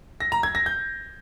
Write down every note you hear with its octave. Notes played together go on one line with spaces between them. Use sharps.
A#6
A#5
G#6
A#6
G6